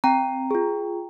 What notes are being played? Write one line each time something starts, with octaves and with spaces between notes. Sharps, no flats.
C4 G5 A#5
F4 G#4